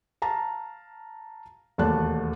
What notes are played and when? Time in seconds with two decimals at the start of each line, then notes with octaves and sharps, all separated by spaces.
0.22 F5 A5 A#5
1.78 E1 D#2 A3 D5 A5 F#6